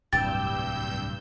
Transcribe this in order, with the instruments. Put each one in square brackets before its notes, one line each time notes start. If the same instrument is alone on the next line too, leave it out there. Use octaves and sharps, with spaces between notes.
[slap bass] D1 C2 [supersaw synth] G2 E6 G6 [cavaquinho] G4 [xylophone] A6